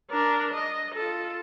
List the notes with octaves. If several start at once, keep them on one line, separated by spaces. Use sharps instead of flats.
D4 A#4
D#5
F4 A4